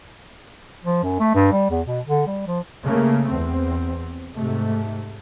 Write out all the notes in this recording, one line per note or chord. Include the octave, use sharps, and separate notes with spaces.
F3
F#2
A3
G2
G3
E2
B2
D3
G3
F3
C#3 A3 A#3
E2 C4
G#2 C3 A3